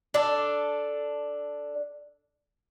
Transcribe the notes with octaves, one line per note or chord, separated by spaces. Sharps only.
D4 A4